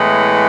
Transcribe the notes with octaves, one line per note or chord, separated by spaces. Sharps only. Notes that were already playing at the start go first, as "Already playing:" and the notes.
Already playing: A2 E3 G#3 B3